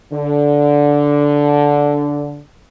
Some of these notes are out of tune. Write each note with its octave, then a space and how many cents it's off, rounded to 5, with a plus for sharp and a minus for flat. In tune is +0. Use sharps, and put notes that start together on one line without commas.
D3 -10